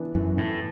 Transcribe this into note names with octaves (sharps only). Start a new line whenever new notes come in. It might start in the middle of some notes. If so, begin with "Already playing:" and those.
Already playing: E3 B3 D4
F#2 E3
A2 E3